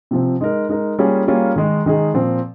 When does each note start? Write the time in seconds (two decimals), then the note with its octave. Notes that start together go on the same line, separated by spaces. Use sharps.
0.11 C3 F3 C4
0.41 G#3 D#4 A#4
0.69 G#3 D#4 A#4
0.99 G3 A#3 C#4 F4 G#4
1.27 G3 A#3 C#4 F4 G#4
1.56 D#3 G#3 D#4 G#4
1.86 D#3 G#3 D#4 G#4
2.14 A#2 F3 C4